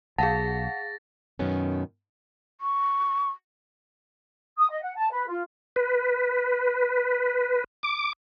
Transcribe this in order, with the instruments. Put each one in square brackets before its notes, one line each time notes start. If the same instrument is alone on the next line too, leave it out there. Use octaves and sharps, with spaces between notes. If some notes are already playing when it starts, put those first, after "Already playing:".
[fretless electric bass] B1 [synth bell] G#4 F5 F#5 [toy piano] A5 [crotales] A6 A#6
[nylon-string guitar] F#2 B2 D#3 B3 C#4
[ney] C#6
[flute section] D#6
D#5
F#5
A5
B4
F4
[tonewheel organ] B4
D6